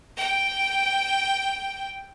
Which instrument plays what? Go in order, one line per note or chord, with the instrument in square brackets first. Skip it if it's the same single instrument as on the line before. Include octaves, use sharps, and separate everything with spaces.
[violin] G5